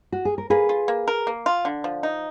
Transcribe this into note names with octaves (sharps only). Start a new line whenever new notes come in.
F#4
G#4
A#4
A#3 G#4 B4
F4
A#3
A#4
A#3
F4
D3
F3
D#4